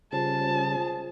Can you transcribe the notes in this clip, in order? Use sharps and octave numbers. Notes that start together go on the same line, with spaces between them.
C#2 C#3 G3 C#4 F4 G#4 C5 A5